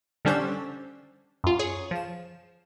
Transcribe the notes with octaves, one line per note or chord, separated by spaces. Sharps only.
D3 G3 C#4 D4 C5 E6
F#2 F4
G#4 C#5
F3 E7